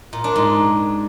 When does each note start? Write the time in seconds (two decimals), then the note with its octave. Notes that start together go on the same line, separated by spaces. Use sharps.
0.13 A#2
0.24 D4
0.36 G#2